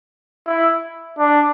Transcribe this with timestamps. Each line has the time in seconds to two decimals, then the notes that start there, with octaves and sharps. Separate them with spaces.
0.46 E4
1.18 D4